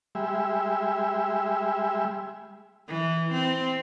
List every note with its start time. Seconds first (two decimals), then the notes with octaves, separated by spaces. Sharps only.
0.15 G3 G#3 E5
2.88 E3
3.33 C4